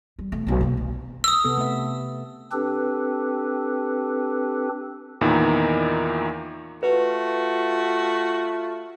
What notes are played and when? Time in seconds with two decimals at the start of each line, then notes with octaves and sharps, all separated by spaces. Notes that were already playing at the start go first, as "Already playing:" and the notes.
0.19 G3
0.32 B1 A3
0.47 B1 C3
0.61 A#3 C4
0.77 G1
1.24 D#6 E6
1.44 C3 B3 A4
1.58 A3 E5
2.52 C4 D4 G4 A4 B4
5.21 E2 A#2 D#3 D#4 E4
6.83 A3 F4 F#4 B4